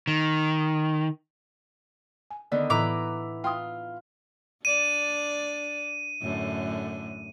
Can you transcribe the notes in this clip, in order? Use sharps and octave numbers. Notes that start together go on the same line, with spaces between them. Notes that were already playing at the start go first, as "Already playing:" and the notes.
D#3
G#5
D3 D#3 B3 D5
A2 E3 E4 B4 A#5 D6
F4 G5 C6 D#6
D4 D5 D#7
F#2 A2 D3